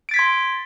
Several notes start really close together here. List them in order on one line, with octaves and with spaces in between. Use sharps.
D7 A6 B6 G#6 C6